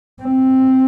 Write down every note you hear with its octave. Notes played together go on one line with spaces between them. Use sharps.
C4